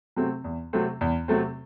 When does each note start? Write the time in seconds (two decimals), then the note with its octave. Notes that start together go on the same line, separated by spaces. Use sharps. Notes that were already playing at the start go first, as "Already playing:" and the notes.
0.16 C3 F#3 A3 C4
0.44 E2
0.73 C3 F#3 A3 C4
1.01 E2
1.28 C3 F#3 A3 C4